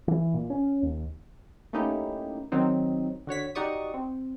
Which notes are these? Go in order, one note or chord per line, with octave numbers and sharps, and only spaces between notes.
E3
A#2
C#4
D#2
A3 A#3 C#4 D#4 E4 G4
D#3 F#3 C4 D#4
D3 F#4 C#5 B6
D#4 F#4 G4 D5 C#6 D#6
C4